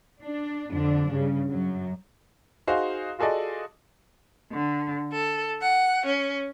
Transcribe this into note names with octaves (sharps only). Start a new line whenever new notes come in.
D4
F2 D3 D4
G2 C#3
F#2 F#3
D#4 F#4 G#4 C5 F5
F4 F#4 G#4 A4 D5 D#5
D3
A4
F#5
C#4